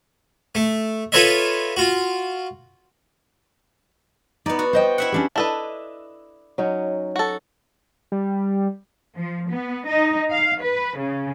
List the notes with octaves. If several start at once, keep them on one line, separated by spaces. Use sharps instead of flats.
A3
F4 A4 B4 C#5 D#5 E5
F4 F#4
B3 D#4 D5
F#4
C5 D#5 G5
E4 E5 F#5
C#4 D4 G4
D4 E4 A4 B4 D#5
F#3 C#4 D#4
F#4 A4
G3
F3
B3
D#4
F5
B4
C#3